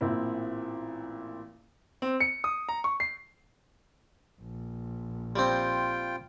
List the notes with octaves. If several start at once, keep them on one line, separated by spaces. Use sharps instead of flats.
A1 A#2 C4 E4
C4
C#7
D#6
A#5
C#6
C7
A#1
G3 C4 F4 G5